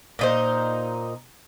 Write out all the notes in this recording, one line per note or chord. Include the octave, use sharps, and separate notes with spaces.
A#2 D#4 C5